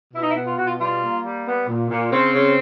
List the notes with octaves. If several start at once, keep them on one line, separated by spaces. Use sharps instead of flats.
B2 E4
D#4
E4
B3
F4
B2 F#4
F4
G3 F4
A#3
G3
B3
A#2
A#2
C#3 C4
C#3